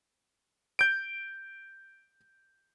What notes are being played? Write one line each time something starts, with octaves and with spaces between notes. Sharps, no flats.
G6 D7